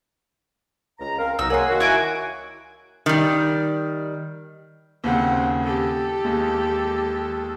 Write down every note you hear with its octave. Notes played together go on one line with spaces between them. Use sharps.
C#2 A#5
C4 A#4 F5
C2 F#3 B3 D#4 E6
A#3 G#4 A#4 C#5 F#5 G#5 C6
D#3 A#3 F#4
E4 G#5 D6
D#3 G3
D#2 C#3 C4 F#5
G4 A4
D#2 G#3